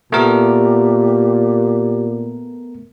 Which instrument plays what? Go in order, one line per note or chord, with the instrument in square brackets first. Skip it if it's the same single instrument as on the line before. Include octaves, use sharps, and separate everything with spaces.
[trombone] A#2 [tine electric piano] A3 B3 A#4 [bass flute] G4